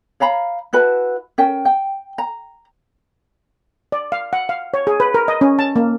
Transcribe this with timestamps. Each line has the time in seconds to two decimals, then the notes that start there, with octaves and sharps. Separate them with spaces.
0.20 C#5 F5 A#5 B5
0.73 E4 F#4 B4 A5
1.38 C#4 A#4 G5
1.65 G5
2.18 A#5
3.92 D5
4.12 F5
4.33 F#5
4.49 F5
4.74 C#5
4.87 G#4
5.00 B4
5.14 A#4
5.28 D#5
5.41 C#4
5.59 A5
5.76 A#3